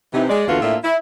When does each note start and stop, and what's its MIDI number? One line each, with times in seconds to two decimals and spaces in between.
0.13 0.28 48
0.13 0.28 52
0.13 0.28 63
0.29 0.44 56
0.29 0.44 74
0.48 0.60 40
0.48 0.60 50
0.48 0.60 58
0.48 0.60 65
0.48 0.60 66
0.48 0.60 71
0.61 0.77 45
0.61 0.77 58
0.61 0.77 62
0.61 0.77 65
0.61 0.77 76
0.84 0.96 64